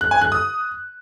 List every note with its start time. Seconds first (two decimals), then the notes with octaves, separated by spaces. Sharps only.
0.01 F#6
0.11 G#5
0.22 F#6
0.32 D#6